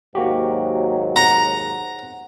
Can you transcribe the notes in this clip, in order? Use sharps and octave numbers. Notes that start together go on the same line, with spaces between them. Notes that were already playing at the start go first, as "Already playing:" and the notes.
D#2 G#2 F#3 A#3 F#4 G4
F#5 A#5